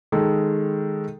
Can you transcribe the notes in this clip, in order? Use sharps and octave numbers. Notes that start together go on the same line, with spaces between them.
D#3 G#3 A4